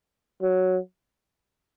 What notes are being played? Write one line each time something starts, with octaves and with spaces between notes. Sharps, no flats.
F#3